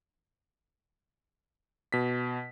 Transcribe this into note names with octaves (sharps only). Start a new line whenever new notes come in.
B2 B6